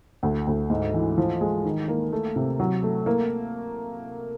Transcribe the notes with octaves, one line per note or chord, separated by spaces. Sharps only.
D2
D2
G#2
E3
F3
G#3
D#3
A#3
A3
C3
F#3
A3
A#3